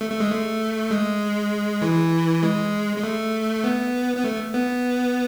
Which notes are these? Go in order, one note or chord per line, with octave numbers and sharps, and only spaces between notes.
A3
A3
G#3
A3
G#3
E3
G#3
G#3
A3
B3
B3
A3
B3